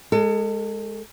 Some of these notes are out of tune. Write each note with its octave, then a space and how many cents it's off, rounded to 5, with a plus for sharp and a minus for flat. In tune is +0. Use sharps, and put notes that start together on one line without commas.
G#3 +0 A4 +35